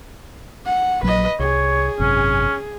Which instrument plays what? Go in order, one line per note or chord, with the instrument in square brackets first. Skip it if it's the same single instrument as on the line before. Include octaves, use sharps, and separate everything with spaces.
[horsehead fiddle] F#5
[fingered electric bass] A#1 F#3 [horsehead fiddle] B4 D#5
[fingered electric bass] C2 [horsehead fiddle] G#4 [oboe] C#5
[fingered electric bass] G#1 F#2 C3 [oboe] C#4